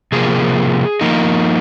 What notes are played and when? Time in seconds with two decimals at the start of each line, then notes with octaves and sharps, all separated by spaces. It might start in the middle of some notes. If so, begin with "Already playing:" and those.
0.12 C3 F3 A#3 G#4
1.01 F3 A#3 D#4